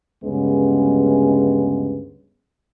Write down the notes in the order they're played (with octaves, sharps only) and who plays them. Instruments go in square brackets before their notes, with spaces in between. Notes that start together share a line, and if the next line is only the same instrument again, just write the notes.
[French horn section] D2 G2 C#3 G#3 B3 C#4